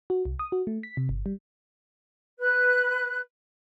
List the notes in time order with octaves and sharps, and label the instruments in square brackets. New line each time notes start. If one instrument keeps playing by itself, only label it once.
[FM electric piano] F#4
C2
D#6
F#4
A3
B6
C3
G1
G3
[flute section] B4 F#6